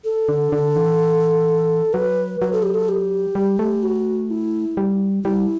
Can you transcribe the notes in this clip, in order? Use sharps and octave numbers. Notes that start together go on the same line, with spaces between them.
A4
D3
D3
E3
F#3 B4
F#3 B4
A4
G4
A4
G4
G3
A3
F#4
E4
G3
G3 E4